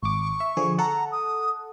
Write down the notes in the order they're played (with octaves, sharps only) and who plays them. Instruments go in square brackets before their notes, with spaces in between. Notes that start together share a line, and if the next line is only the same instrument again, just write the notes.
[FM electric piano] G#1 D6 [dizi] C#6
[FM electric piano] E5
D3 F3 G#4
[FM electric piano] A4 F#5 [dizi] A#5
[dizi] D#6